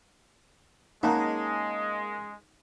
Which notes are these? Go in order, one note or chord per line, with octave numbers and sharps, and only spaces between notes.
G#3 A#3 C#4 D#4 F#5 G#5 A5